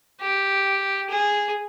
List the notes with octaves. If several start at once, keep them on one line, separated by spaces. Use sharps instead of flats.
G4
G#4